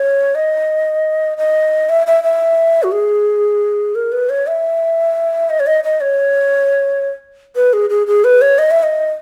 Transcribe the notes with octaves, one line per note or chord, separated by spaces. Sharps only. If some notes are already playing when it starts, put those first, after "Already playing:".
Already playing: C#5
D#5
D#5
E5
E5
E5
F#4
G#4
A#4
B4
C#5
E5
D#5
C#5
D#5
D#5
C#5
B4
G#4
G#4
G#4
B4
C#5
D#5
E5
D#5